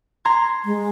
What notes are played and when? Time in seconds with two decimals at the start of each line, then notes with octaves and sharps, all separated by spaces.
0.25 A#5 C6 G#6
0.65 G#3